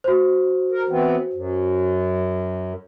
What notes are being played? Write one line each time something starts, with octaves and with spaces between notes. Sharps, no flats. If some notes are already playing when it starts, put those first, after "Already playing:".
F#4 C5
A#4
E3 B3 C4
F#2